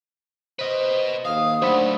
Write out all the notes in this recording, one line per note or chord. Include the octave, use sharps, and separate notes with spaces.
B4 C5 D#5
D#2 F5 D#6
F#3 A3 D4 C5 F#5 B5